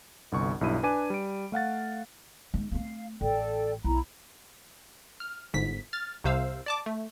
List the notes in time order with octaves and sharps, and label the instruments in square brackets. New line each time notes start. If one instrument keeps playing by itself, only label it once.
[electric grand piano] G1 C2 C#6
B1 G2 E4 D#7
D4 B4 G#5 D6 D#7
G3 D7
A3 F5 F#5 A6
[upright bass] G#3 D#4
[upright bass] A3 C4 [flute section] F5
[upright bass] A1 [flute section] A4 D5 G5
[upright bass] B1 [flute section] E4 A#5 B5
[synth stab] F6
G1 G#2 B6
F6 A6
C2 C3 C5 F5 E6
D5 A5 D6
A3